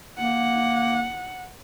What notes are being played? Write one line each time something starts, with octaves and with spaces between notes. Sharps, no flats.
A#3 F#5